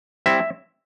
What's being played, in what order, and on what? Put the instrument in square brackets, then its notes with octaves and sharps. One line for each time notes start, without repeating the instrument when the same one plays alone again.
[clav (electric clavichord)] G3 C4 E4 E5